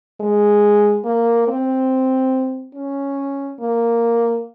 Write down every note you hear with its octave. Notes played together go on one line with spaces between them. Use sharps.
G#3
A#3
C4
C#4
A#3